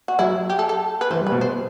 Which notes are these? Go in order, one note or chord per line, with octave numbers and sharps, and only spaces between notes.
F#4
F#3 E4
G4
A4
A4
B4
E3 C5
G3
B4
B2
C5